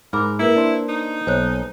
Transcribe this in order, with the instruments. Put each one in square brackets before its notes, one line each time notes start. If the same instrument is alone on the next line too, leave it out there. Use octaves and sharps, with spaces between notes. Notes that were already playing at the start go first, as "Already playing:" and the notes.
[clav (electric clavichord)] G#2 [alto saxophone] A#4 [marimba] B5 D6
[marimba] A#3 A#4 B4 [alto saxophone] E4
[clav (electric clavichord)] D4 C5
[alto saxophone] D#4
[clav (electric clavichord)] B1 [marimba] C5 C#5 F#6